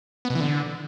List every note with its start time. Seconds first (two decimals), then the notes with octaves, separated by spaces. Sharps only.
0.25 B3
0.30 B2
0.35 E3
0.40 D3